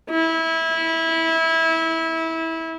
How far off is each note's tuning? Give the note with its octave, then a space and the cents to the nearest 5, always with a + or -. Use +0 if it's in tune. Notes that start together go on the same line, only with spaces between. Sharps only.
E4 -20